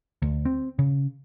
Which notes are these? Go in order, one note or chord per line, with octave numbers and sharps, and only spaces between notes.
D2
C4
C#3